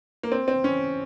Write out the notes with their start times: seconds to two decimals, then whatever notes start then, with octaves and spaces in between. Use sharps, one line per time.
0.23 A#3
0.32 C4
0.48 C4
0.64 C#4